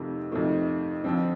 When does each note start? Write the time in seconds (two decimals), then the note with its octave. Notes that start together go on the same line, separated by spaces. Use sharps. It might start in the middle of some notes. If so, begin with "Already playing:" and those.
Already playing: F2 C3 D#3 A3
0.31 F2 C3 D#3 A3
1.04 F2 D3 F3 C4